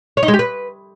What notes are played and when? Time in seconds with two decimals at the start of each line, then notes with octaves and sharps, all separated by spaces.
0.17 C#5
0.23 D#4
0.28 G#3
0.34 G4
0.39 B4